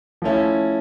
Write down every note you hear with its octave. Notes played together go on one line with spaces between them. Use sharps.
F3 A3 C#4 E4